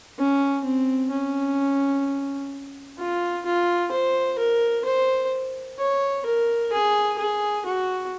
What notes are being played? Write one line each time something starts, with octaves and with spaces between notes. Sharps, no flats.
C#4
C4
C#4
F4
F4
C5
A#4
C5
C#5
A#4
G#4
G#4
F#4